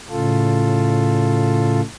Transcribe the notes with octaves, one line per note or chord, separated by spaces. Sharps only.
A2 C#3 F4 A4